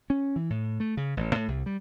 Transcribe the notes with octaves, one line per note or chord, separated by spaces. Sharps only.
C#4
E3
A2
A3
C#3
A1
A2
C2
G3